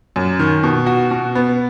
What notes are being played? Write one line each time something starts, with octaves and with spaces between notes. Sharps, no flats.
F#2
D#3
B2
F#4
B2
B3